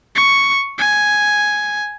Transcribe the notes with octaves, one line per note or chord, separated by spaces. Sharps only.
C#6
G#5